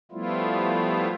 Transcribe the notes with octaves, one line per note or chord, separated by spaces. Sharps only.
F3 G3 A3 B3 E4 F4